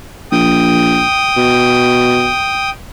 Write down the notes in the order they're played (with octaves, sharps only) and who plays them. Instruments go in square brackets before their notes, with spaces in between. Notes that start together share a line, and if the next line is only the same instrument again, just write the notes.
[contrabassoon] A#1 [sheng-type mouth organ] G5 D#6
[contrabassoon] B2